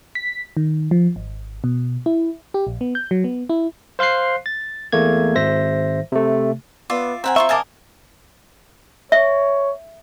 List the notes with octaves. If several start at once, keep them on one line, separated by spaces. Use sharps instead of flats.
B6
D#3
F3
G#1
B2
E4
G4
A#1
B3
G6
F#3
B3
E4
C5 F5 C6 F#6 C7
A6
E2 A3 A#3 G#6
G#1 C5 E5 A#6
C3 A3
B3 F4 D5 E5
C4 E5 F#5 G#5 A#5
F4 E5 C6 C#6
A#4 D#5 F5 G#5 A5 D6
C#5 E5